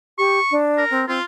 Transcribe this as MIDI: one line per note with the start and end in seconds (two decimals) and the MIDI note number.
0.18 0.39 67
0.18 0.55 85
0.51 0.84 62
0.77 1.02 70
0.90 1.06 60
1.08 1.19 60
1.08 1.24 65